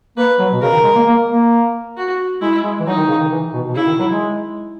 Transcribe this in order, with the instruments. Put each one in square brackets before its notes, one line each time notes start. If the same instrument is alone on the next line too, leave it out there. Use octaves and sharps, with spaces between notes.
[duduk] A#3 [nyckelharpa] B4
[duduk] F#3
B2
[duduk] C#3 [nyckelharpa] A#4
[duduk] D#3
G#3
A#3
A#3
A#3
[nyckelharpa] F#4
[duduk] G#3 [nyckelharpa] E4
[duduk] G#3
E3
[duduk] F#3 [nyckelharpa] D#4
[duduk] D#3
C#3
D#3
E3
B2
B2
[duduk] C#3 [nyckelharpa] E4
[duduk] D#3
F#3
G#3